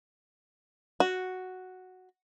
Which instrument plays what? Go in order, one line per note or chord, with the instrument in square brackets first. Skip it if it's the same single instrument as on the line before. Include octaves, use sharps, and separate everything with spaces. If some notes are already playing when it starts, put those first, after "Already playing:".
[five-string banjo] F#4